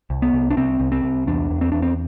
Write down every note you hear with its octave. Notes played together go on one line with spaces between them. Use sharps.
C2
B3
C2
D4
C2 C4
C2
C4
C2
E2 D4
E2
C4
E2 D4
C4